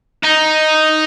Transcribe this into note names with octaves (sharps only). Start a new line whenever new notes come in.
D#4